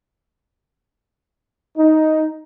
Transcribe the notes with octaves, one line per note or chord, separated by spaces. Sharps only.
D#4